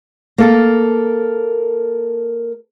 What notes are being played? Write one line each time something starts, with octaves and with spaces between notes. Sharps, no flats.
A#3 A4 A#4